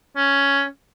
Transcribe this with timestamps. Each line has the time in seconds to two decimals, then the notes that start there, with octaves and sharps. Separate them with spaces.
0.16 C#4